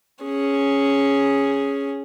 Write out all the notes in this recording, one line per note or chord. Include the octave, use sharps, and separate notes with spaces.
C#4 G#4